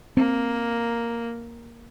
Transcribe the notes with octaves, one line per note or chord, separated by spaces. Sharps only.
A#3 C4